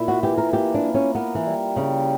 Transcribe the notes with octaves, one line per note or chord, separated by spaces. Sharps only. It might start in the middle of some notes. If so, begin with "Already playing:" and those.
Already playing: A#2 E4
F#4
E3 G4
A#4
A#3 G4
D4
A#3
C#4
B3 A#4
E3
G3
C#3 G4